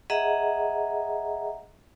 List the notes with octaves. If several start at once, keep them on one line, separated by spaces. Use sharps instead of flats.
G#4 D#5 E5 F#5 A#5